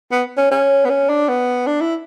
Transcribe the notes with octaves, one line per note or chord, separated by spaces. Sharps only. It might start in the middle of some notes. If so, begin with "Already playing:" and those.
B3
C#4
C#4
B3
C#4
D4
B3
D4
E4